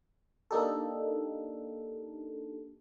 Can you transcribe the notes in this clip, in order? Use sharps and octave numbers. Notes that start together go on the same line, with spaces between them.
A#3 D4 D#4 G4 A4